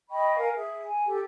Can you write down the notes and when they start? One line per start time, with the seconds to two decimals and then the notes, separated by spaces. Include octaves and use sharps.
0.10 D#5 G5 B5 C#6
0.36 A#4 F5 G#5
0.56 G#4 E5
0.84 G#5
1.06 G4 A4